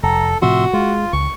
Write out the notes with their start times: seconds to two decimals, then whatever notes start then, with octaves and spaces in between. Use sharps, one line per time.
0.03 F1 A4 A#5
0.42 A2 C3 F3 F#4 E5 C6
0.73 G#3 F4
1.13 C#2 C#6